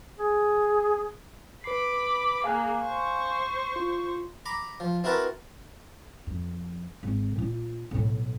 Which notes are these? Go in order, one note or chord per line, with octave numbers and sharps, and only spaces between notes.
G#4
B4 B5 D6 C7
A#3 G#4 F5 G#5 F#6
C5 C#6
F4
A#5 B5 D6
F3
C4 E4 F#4 A#4 B4 A5
F2
G#1
A#2 F4
B1 A2